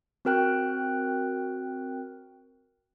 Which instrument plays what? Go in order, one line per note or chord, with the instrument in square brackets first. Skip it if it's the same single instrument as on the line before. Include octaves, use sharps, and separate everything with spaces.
[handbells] C4 F#4 A#4 G5 F#6